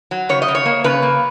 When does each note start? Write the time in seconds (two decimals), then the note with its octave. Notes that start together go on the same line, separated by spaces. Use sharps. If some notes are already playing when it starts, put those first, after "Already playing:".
0.11 F#3
0.29 C#3 C#5
0.42 D#5
0.48 C#3
0.55 C#5
0.66 A#3
0.84 C#3 B4
1.03 A#3